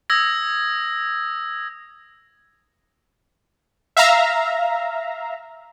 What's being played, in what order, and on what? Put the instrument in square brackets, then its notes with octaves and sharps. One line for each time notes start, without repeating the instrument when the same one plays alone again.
[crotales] D#6 E6 G#6 A#6
[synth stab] E5 F5 A#5